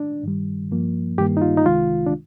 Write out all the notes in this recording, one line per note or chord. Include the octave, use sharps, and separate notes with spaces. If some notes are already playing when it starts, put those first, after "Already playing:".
Already playing: D4
G2 D#3 G3
G2 F3 A#3
G2 D#3 G3 A#3 G4
D#4
F4
D#4
C2 C3 D#3 G#3 F4
D4